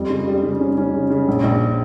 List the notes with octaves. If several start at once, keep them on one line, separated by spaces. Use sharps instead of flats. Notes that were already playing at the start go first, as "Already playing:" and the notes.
Already playing: F2 G3
C#3
G3
C#3
C#4
C#4
C#3
C#3
A#1
A#1